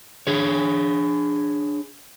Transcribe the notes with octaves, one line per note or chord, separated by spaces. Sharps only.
D4 G#4 C#5